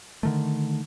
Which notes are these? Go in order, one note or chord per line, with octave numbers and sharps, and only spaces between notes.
D3 D#3 A3